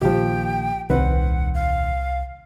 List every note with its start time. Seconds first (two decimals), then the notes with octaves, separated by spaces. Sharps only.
0.01 A#1 A#2 D#3 F3 G4 G5
0.90 D#1 C2 D#3 C4 B4 F#5
1.54 F5